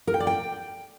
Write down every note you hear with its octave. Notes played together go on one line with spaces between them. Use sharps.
A#4
G5
D5
G5